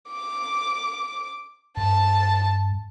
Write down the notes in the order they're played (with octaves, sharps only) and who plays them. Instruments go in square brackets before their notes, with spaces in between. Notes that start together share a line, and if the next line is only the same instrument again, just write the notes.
[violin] D6
[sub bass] G2 [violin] A5